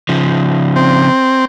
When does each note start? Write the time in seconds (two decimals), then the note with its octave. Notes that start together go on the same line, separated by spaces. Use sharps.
0.09 C#3 F3
0.76 C4